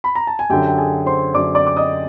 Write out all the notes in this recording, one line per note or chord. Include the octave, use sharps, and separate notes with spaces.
B5
A#5
A5
G#5
F#2 D3 F#3 G4 G5
G5
G#4 G#5
C5 C6
F#2 D3 F#3 D5 D6
D5 D6
D6
D#5 D#6